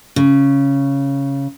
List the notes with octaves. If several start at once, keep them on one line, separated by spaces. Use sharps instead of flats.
C#3